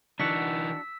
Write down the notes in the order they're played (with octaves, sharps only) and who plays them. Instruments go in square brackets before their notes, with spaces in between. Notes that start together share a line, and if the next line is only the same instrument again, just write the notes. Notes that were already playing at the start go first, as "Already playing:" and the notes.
[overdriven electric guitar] E3 D#4 [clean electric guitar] D4 F#4 F#5 [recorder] E6 [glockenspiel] B6